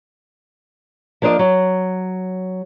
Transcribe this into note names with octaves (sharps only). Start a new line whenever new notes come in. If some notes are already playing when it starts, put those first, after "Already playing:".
F3 A#3 D4 C5 D#5
F#3